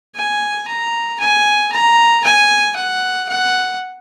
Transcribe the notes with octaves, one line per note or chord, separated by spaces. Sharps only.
G#5
A#5
G#5
A#5
G#5
F#5
F#5